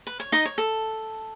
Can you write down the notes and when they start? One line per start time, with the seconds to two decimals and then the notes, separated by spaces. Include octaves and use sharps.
0.07 B4
0.20 C#5
0.32 D#4 D#5
0.45 C#5
0.58 A4